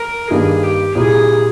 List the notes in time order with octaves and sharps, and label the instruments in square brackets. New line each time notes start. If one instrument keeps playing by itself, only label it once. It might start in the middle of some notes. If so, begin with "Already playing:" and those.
Already playing: [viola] A#4
[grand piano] G2 D#3 G3 A#3 [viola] G#4
[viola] G4
[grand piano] C2 A#2 G3 [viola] G#4